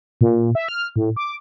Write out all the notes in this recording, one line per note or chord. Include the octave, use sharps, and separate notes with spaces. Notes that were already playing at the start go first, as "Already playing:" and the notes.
A#2
E5
F6
A2
D6